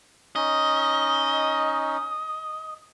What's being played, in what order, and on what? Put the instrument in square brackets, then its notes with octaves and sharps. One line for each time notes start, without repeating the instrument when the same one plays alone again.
[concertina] C#4 D#4 [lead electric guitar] D#5